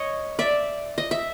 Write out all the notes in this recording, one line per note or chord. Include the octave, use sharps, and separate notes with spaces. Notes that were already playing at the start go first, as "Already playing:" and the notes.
Already playing: C#5 D#5
D5 E5
D#5
E5